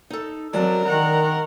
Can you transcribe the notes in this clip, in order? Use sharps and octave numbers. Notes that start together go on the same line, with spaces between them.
D#4 A4
F#3 G#3 C4 A#4 D5 A5
D#3 F#5 A#5